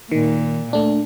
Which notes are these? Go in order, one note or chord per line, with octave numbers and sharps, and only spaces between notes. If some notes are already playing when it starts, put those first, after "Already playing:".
A#2 D#3
A3 D4